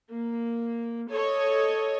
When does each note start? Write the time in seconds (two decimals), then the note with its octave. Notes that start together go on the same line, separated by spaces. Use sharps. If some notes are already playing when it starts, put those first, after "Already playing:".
0.11 A#3
1.10 A4 C#5 D#5